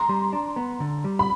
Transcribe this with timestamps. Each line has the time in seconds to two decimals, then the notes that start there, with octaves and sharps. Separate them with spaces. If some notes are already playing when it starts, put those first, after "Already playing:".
Already playing: A#5 C6
0.09 G3
0.33 D4
0.56 B3
0.80 D3
1.04 G3
1.19 B5